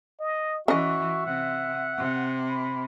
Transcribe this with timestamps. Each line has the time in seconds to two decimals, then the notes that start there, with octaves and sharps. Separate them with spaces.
0.20 D#5
0.68 E3 C#4 F#4 D#5 E5
1.26 C3 F#5
1.98 C3
2.49 B5